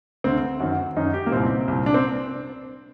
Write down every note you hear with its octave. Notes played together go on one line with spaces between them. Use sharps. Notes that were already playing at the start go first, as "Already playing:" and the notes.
D2 D3 C4
F#2 D#3 F#4
F#2 D#3 D#4
G4
A#3
C2 A#2 C4
C2 A#2
D4
C4